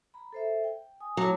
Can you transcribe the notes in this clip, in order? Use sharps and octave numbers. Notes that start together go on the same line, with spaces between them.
A#5 B5
A4 C5 E5
G5
G#5 D#6
F#3 A3 A5 D6